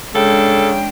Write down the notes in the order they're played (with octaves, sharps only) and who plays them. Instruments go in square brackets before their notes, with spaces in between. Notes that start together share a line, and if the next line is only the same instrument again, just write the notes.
[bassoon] C#3 [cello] G#3 D4 [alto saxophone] A4 [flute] G5